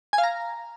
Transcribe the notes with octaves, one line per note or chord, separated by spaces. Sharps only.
G#5
F5
A#5